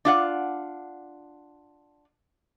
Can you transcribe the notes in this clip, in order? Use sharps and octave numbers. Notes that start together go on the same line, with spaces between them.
D4 F4 F#5